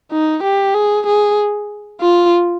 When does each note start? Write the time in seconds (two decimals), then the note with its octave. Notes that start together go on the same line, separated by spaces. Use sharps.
0.11 D#4
0.44 G4
0.74 G#4
1.07 G#4
2.01 F4